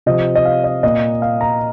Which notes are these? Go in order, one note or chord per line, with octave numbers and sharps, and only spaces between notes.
C3 F3 C4 D#5
D#5
F5
D#5
A#2 A#3 D#5
F5
A#5